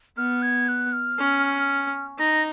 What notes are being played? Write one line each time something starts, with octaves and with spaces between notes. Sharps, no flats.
B3 F6
G#6
F#6
F6
C#4
D#4 A#6